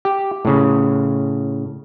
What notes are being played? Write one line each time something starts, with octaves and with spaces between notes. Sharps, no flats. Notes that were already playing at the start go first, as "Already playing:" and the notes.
G4
A2 C#3